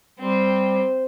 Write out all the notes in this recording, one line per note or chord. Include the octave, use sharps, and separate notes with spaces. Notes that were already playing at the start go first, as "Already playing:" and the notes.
G3 C4 C5